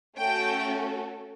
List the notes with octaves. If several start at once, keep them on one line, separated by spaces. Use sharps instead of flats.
A3 C#4 F#4 A4 G5